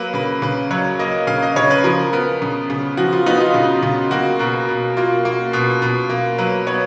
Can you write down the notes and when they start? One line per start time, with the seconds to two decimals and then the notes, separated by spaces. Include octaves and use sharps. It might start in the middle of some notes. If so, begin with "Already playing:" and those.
Already playing: F#3 A#3 B4
0.14 C#3 B4
0.42 C#3 B4
0.71 F#3 C#5
0.99 A#3 D#5
1.27 C#3 F5
1.43 D#5
1.56 C#3 C#5
1.71 B4
1.84 F3 A#4
2.13 B3 A#4
2.42 C#3
2.70 C#3
2.97 F3 F#4
3.13 F4
3.26 B3 D#4
3.40 F4
3.54 C#3
3.83 C#3
4.11 A#3 F#4
4.39 B2 A#4
4.68 B2
4.97 A#3 F4
5.25 A#3
5.53 B2
5.82 B2
6.10 A#3
6.38 F#3 B4
6.67 B3 C#5